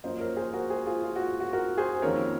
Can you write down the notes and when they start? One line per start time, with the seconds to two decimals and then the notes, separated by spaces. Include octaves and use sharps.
0.04 F#2 F3 A#3 C5 D#5
0.20 A#4 C#5
0.37 G#4 C5
0.53 F#4 A#4
0.70 G#4 C5
0.86 F4 G#4
1.03 F4
1.16 F#4
1.40 F#4
1.53 F#4 A#4
1.78 G#4 C5
2.02 F2 D#3 A#3 C#4 A#4 C#5